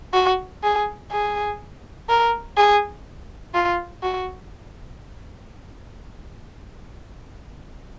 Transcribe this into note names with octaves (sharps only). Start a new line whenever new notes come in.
F#4
G#4
G#4
A#4
G#4
F4
F#4